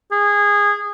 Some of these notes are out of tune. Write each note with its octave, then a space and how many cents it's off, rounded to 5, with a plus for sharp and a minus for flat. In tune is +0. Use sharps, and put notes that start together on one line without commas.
G#4 -20